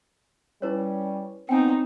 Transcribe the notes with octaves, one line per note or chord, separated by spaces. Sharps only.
G3 C#4 E4 B4 C#5
B3 C4 D#4 C#5 G5 G#5